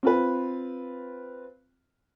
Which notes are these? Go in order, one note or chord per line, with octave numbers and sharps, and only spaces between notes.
C4 F4 B4